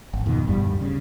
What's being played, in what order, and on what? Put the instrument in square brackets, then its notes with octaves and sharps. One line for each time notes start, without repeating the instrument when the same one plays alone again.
[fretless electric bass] G#1
F2 B2 D#3
G1 D2 G2 G3
C#3